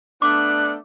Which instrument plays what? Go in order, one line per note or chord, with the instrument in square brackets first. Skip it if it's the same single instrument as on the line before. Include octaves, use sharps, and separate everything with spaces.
[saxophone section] A3 B3 D4 [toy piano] D6 [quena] F#6